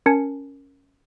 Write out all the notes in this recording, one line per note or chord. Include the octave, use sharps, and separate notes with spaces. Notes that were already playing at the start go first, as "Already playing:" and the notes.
C#4 A#4 G#5 A5 G#6 C#7